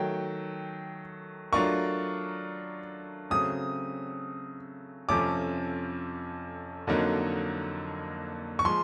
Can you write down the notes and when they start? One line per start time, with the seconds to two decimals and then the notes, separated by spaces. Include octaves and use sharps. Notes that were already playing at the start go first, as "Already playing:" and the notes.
Already playing: D#3 F#3 A3 G5
1.52 F#3 A3 D4 F4 A#4 C#6
3.30 C#3 F#3 A3 C4 D#6
5.09 F2 C3 F3 A3 C#4 D6
6.87 F2 D3 F#3 A#3 D#4
8.59 C#6
8.65 F3 G#3 C6